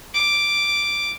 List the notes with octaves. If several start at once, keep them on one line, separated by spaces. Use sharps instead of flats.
D6